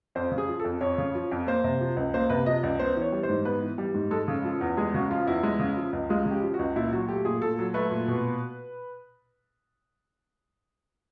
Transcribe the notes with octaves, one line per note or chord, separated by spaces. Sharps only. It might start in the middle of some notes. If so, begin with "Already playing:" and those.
F2 C5
C#3
G#4
F3
F2 A4
F2 C#5
C#3
F3
F2
A#3 C5
C3
F3
C#2
A#3 C5
C3 B4
F3 D#5
C#2 D5
B3 C5
E3 C#5
G3
C5
G#2
B3 B4
E3
G3
G#2
G#3 A4
C#3
F3
E2
G#3 G#4
C#3 F#4
F3 F4
E2 E4
G#3
C#3
F3
C#2
G#3 F4
C#3
G4
F3
F#4
C#2
A#2 E4
F#3 F#4
A3 G4
A#2 G#4
A#2 A4
F#3
A3 B4
A#2
B2